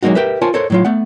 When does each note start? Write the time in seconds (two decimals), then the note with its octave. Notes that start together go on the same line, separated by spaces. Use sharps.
0.03 F#3 G#3 A#3 D#4 F#4
0.15 G4 A#4 B4 E5
0.42 F4 A#4 C5 C#5 G#5 A5
0.54 A4 A#4 C5 C#5
0.70 A2 F#3 F4
0.85 A3 B3 F#5